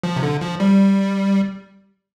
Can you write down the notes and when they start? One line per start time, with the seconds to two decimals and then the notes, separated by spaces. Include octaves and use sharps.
0.03 F3
0.16 C3
0.23 D3
0.41 F3
0.60 G3